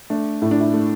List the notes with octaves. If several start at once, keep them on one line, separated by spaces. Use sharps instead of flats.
A3 D4
A2 E4
D4
E4
A3